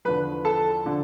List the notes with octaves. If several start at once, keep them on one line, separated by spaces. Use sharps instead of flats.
E2 D3 F3 B4 B5
A4 A5
D3 F3